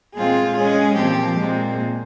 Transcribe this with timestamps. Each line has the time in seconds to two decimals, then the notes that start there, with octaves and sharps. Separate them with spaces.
0.15 A#2 G#3 C4 F4 G#4
0.57 G#3 C#4 G#4
0.97 A#2 F3 C4 G4
1.39 A#2 G#3 C4